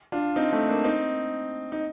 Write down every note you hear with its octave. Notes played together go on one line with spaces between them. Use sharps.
D4 F4
C4 D#4
A3 C4
A#3 D4
C4 D#4
D#4